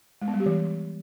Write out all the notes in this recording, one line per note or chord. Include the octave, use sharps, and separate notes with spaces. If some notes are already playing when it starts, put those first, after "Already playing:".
G#3
B3
G3
G4
E3